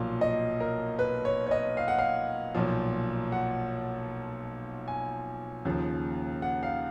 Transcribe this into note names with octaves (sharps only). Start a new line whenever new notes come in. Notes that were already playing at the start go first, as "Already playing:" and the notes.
Already playing: B1 A#2 F3 F5
D#5
A#4
B4
C#5
C#5
D#5
F5
F#5
F5
B1 A#2 F3
F#5
G#5
D#2 C#3 F3
F#5
F5